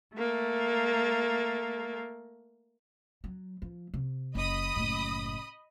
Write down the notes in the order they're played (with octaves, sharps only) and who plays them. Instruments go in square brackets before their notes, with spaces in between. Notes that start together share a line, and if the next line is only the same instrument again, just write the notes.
[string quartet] A3 A#3
[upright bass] F#3
F3
C3
[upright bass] F#1 [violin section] D#5 B5 D#6
[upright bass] F#1 A2